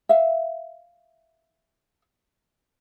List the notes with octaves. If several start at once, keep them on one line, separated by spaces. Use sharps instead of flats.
E5 F5